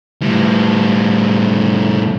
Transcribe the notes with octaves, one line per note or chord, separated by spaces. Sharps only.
A2 G3